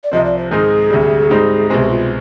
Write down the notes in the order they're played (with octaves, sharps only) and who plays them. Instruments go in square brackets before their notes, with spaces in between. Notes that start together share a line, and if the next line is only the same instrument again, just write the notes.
[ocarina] D5
[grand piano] C2 C3 F3 C4 [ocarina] D#5
[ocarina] D5
C5
[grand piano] G#2 D#3 G#3 C4 D#4 [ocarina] G#4
[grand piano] D2 C3 G3
G#2 G3 C4 D#4
[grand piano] C2 B2 G#3 C4 [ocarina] G4
[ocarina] F4